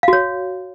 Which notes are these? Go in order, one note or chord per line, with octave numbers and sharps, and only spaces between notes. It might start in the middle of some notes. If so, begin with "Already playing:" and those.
F#4 C#5 F5